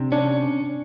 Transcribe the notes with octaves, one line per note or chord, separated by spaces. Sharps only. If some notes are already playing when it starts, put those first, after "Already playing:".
Already playing: C3 D4
C#4 D4